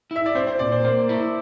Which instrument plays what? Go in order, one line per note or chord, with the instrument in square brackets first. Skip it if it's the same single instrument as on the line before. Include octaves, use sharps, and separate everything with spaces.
[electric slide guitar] E4 [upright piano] E5
[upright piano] D5
[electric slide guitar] C4 [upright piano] C5
[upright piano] C5
[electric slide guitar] A#2 [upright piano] D5
[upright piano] C5
[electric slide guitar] A#3 [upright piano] C5
[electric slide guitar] E4